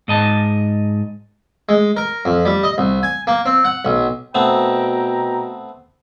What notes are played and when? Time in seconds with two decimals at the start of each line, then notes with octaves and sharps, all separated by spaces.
0.08 G#2 D#5 A5
1.69 G#3
1.97 A#4
2.25 F2
2.45 G3
2.63 D#5
2.78 C2
3.03 G#5
3.27 A#3
3.46 C4
3.65 F#5
3.85 B1
4.35 B2 A3 B3 C4 G5 A#5